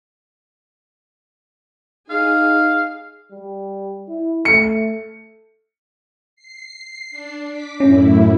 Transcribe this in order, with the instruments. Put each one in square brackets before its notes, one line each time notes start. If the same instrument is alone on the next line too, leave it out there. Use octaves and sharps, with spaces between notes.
[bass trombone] D#4 [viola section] G#4 [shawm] F5
[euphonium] G3
E4
[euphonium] A3 [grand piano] C#7
[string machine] C7
D4
D6 B6
[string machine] F#2 A2 E4 [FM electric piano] C#4